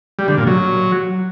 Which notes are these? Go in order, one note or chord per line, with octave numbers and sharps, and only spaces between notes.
G3
D3
A#2
F#3